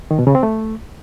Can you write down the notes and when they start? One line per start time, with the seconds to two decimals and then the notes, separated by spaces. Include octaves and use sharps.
0.11 D#3
0.19 B2
0.27 C#3
0.35 C4
0.43 A3